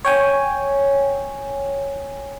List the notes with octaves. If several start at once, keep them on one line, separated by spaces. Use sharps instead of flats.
C#5 G5 G#5